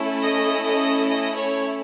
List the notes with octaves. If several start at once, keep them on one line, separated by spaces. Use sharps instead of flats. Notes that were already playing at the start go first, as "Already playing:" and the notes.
Already playing: A3 C#4 E4 A4
D#5
D#5
D#5
C#5